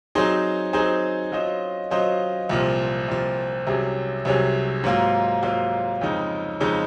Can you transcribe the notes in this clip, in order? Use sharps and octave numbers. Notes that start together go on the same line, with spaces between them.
F#3 C4 D#4 G#4 C5
F#3 C4 D#4 G#4 C5
F#3 C#4 F4 C5 D#5
F#3 C#4 F4 C5 D#5
C2 A#2 F3
C2 A#2 F3
C2 C3 F#3 C#4 G#4
C2 C3 F#3 C#4 G#4
G#2 F#3 A#3 F4
G#2 F#3 A#3 F4
F2 C#3 G#3 D#4
F2 C#3 G#3 D#4